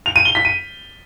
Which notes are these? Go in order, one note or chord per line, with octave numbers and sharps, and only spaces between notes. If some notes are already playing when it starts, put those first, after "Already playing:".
F7
D#7
G7
B6
D#7